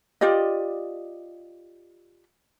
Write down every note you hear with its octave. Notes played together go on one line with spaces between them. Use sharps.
F4 G4 D5 D#5